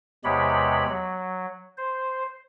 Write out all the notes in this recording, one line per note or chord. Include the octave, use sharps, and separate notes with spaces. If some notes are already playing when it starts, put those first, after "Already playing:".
E2 C3 G#3 G4 C#5 B5
F#3
C5